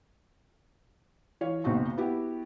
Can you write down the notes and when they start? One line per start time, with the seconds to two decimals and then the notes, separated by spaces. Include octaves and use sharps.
1.41 E3 C#5 F5
1.64 F#1 B1 C4 D#4 F#4 C#6
1.97 B3 E4 F#4 G4